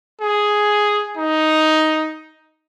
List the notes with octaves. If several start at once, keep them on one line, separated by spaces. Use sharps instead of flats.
G#4
D#4